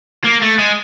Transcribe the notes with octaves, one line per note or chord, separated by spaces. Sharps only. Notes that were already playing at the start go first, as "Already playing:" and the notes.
A#3
A3
G#3